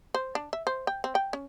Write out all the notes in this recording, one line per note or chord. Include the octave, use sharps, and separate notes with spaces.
C5
D4
E5
C5
G5
C4
G5
C#4